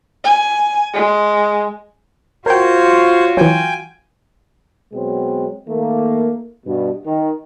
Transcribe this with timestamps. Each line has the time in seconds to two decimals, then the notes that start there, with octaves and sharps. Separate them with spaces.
0.24 G#5
0.94 G#3
2.46 F4 F#4 A#4 C5 C#5 G5
3.37 E3 F#3 G5 G#5
4.93 B2 F#3 G#3 B3 C4
5.68 D#3 A3 A#3
6.66 G2 B2
7.05 D#3